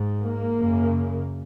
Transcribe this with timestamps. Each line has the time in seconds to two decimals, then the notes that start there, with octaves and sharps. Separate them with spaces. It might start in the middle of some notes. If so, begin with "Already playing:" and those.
Already playing: G#2
0.21 A#3
0.57 F#2 C#3